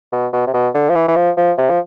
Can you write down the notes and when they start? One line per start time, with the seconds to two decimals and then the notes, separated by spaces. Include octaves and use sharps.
0.13 B2
0.33 B2
0.47 C3
0.54 B2
0.74 D3
0.90 F3
0.95 E3
1.08 E3
1.16 F3
1.37 F3
1.58 C3
1.70 F3